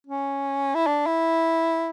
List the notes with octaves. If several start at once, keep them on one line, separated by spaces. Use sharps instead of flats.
C#4
E4
D4
E4